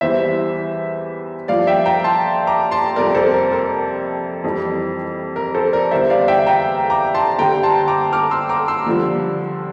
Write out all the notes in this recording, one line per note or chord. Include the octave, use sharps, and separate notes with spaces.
E2 E3 G3 C5 E5
G2 F3 D5 F5
E5 G5
G5 A#5
A5 C6
A#5 D6
A5 C6
F2 C3 G3 A#4 D5
A4 C5
A#4
A#4
F2 E3 G3
A#4
A4 C5
A#4 D5
E2 D3 G3 C5 E5
D5 F5
E5 G5
G5 A#5
A#5 D6
A5 C6
G2 D3 G3 G5 A#5
A5 C6
A#5 D6
D6 F6
C6 E6
A#5 D6
C6 E6
G2 D3 F3